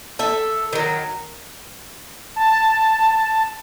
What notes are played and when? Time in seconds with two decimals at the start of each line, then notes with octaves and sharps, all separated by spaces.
0.19 A4 E5
0.73 D#3 F#3
2.36 A5